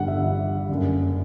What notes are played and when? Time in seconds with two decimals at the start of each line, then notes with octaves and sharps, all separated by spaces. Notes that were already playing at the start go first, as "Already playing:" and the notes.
Already playing: G1 G2 D3 G3 F#5
0.08 E5
0.69 F#1 F#2 D3